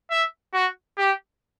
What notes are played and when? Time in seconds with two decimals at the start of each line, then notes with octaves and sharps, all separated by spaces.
0.11 E5
0.54 F#4
0.98 G4